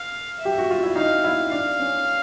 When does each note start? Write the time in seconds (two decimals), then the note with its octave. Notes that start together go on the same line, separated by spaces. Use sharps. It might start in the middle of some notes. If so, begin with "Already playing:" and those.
Already playing: F5
0.39 E5
0.45 G4
0.58 F#4
0.70 F4
0.83 E4
0.96 D#4 F5
1.24 E4
1.51 D4 F5
1.79 C#4